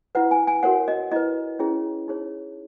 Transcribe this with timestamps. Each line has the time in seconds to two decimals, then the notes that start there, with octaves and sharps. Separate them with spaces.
0.15 E4 B4 F#5
0.31 G#5
0.47 G#5
0.63 F#4 A#4 C#5 F#5
0.88 D#5
1.11 E4 B4 D#5
1.59 C#4 E4 G#4 C#5
2.08 D#4 G#4 C#5